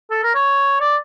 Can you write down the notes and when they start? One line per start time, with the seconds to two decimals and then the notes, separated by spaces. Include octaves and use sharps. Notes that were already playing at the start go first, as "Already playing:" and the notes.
0.11 A4
0.24 A#4
0.35 C#5
0.81 D5